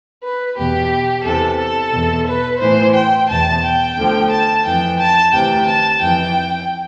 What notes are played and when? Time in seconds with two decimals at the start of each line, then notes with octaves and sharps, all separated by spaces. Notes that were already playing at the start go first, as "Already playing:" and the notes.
0.23 B4
0.57 E2 B2 G4
1.24 E2 C3 E3 A4
1.58 A4
1.92 E2 B2
2.27 B4
2.60 A2 E3 C5
2.94 G5
3.29 E2 B2 A5
3.63 G5
3.96 D2 D3 F3
4.31 A5
4.65 F2 E3 G5
4.99 A5
5.32 D2 C3 E3 G5
5.67 A5
6.01 F2 E3 G5